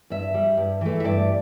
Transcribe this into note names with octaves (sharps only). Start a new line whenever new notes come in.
G2 E5
G3
G2
E3 A3
E5
G2 D5